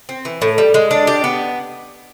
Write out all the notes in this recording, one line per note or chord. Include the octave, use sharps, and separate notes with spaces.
C4
E3
A2
G3
G#3
D4
G4
B3